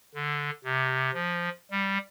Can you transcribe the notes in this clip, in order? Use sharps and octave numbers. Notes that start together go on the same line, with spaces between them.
D3
C3
F3
G3